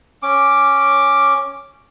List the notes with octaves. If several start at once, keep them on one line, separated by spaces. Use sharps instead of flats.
C#4 D6